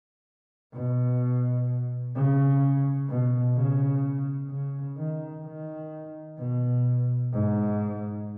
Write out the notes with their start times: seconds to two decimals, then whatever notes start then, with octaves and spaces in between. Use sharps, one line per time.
0.74 B2
2.15 C#3
3.09 B2
3.56 C#3
4.50 C#3
4.98 D#3
5.45 D#3
6.38 B2
7.33 G#2